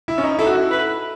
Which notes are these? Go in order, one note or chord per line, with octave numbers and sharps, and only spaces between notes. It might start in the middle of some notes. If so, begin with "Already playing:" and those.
E4
C#4
D#4
E4 A4
F#4
E4
B4